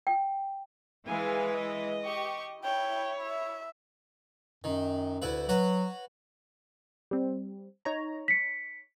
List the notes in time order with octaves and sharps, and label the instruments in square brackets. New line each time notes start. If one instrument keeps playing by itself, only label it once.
[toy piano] G5
[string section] E3 G#3 B4 [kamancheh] F5 G#5
[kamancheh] D#5
[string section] G4 C#6
[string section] E4 [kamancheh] C#5 [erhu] G5
[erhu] E5
[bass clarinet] F#2 [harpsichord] D#3
[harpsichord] D2 E4 B4
[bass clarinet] F#3 [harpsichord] F#4 B4 C#5
[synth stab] G3 C4
D#4 C#5 A#5
[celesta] B6 C#7